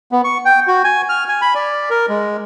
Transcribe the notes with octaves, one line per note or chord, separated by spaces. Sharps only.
B3
C#6
G5
F#4
G#5
F6
G#5
B5
D5
A#4
G#3